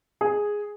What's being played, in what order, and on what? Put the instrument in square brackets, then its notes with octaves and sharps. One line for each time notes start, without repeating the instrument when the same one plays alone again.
[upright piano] G#4